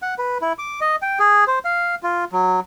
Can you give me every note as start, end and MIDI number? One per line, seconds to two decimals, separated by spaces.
0.02 0.14 78
0.18 0.38 71
0.41 0.53 64
0.59 0.80 86
0.81 0.96 75
1.02 1.19 79
1.19 1.44 68
1.47 1.59 72
1.65 1.95 77
2.03 2.25 65
2.32 2.60 54